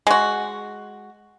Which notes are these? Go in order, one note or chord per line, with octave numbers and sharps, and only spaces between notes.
G#3 F#4